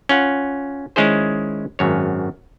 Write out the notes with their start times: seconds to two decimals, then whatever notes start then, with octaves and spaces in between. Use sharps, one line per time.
0.09 C#4 F4 F#5
0.96 D#3 G#3 C#4 E4 G#4 C5
1.79 G#1 F#2 C#5